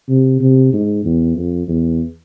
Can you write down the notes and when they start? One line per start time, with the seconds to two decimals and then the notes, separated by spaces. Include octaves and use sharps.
0.09 C3
0.41 C3
0.73 G#2
1.05 E2
1.36 F2
1.68 E2